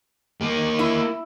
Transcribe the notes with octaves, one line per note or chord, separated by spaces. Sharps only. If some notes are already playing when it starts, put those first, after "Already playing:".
A#3 G4
E4